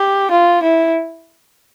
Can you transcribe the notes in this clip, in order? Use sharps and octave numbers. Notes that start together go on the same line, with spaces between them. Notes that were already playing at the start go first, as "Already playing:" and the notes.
Already playing: G4
F4
E4